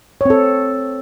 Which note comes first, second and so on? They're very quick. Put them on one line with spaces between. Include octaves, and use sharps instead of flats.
C#5 C4 A4